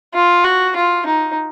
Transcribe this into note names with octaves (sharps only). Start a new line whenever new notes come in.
F4
F#4
F4
D#4